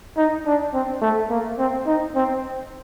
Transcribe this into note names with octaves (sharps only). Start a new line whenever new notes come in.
D#4
D4
C4
A3
A#3
C4
D#4
C4